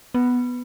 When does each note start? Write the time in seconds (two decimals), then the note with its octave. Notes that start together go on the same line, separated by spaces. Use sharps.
0.14 B3